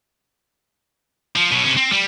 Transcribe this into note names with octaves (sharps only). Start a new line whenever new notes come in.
F3
B2 F#3
C3 C#4
C4
G3